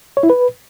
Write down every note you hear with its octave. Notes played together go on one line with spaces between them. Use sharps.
C#5
E4
B4